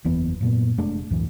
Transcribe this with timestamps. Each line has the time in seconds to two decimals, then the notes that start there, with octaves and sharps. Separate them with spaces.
0.04 F#1 E2 E3 B3
0.41 F#2 A#2 B3
0.78 F1 G#3 A3 D4
1.11 C#2 F#2 A2 E3